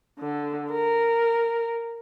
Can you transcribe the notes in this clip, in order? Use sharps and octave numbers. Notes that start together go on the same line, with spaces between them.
D3
A#4